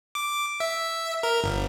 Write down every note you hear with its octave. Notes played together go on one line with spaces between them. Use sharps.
D6
E5
A#4
G1